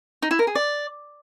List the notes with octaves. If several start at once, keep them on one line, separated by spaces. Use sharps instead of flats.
D#4
E4
A#4
G#4
D5